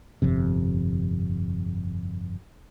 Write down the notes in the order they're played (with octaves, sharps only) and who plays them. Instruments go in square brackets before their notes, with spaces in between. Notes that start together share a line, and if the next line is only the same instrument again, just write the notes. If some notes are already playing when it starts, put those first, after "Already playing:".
[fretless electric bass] G1 F2 C3